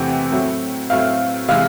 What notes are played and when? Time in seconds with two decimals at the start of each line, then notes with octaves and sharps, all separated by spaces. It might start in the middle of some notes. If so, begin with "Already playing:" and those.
Already playing: E2 C3 E3 A3 C4 G5
0.32 A2 F#3 A3 C4 E4
0.90 A2 F#3 A3 C4 E4 F5
1.48 C3 E3 G#3 F5